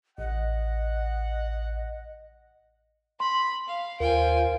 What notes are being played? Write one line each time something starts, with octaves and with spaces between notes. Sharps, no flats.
A1 D#5 F#5
B5 C6
F5
D#2 F4 A#4 C5 G5 G#5